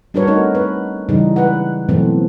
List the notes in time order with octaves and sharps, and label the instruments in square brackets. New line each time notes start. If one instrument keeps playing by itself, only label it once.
[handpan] G3 D4 F#4 A#4 B4 C#5
A3 C4 C#4 D#4 F#4 A#4
B4
C#3 E3 G3 D#4
G#3 B4 F#5
B2 E3 F#3 A3 C4